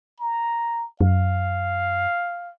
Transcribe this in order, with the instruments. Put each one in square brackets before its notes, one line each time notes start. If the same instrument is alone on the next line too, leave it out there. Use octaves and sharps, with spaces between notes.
[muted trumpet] A#5
[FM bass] F#2 [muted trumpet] F5